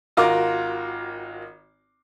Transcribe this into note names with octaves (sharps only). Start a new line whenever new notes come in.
G#1 F4 F#4 A#4 D6